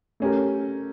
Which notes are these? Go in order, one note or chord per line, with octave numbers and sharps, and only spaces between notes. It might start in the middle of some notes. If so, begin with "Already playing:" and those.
A3 C#4 G4 A#4